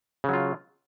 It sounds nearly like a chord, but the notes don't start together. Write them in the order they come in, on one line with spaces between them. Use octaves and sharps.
C#3 F#3 F4